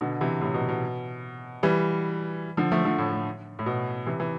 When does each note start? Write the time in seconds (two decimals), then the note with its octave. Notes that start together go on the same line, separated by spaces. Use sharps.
0.01 B2 D3
0.21 C3 E3
0.41 A2 C3
0.54 B2
0.69 B2
1.63 E3 G3
2.57 D3 F3
2.72 F3 A3
2.85 D3 F3
2.98 A2
3.12 A2
3.59 A2
3.66 B2
4.06 C3 E3
4.20 E3